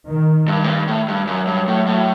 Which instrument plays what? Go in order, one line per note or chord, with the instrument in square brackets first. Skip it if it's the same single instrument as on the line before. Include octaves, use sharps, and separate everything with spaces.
[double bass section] D#3
[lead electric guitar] G2
A2
G2
A2
G2
[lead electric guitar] F#2 [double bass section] F#3
[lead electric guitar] G2
A2
A2